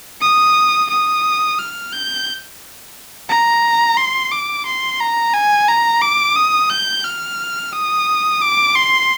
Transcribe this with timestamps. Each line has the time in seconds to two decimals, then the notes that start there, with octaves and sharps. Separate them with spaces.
0.21 D#6
0.90 D#6
1.59 F6
1.92 G6
3.29 A#5
3.97 C6
4.32 D6
4.66 C6
5.00 A#5
5.34 G#5
5.68 A#5
6.01 D6
6.36 D#6
6.70 G6
7.04 F6
7.73 D#6
8.41 D6
8.75 C6